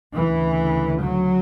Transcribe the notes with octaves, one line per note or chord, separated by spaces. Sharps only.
D2 C#3 E3
F#3